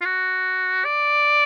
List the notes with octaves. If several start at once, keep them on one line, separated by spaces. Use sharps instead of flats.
F4
F#4
D5